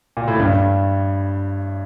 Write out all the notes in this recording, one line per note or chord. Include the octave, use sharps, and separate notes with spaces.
A#2
A2
G2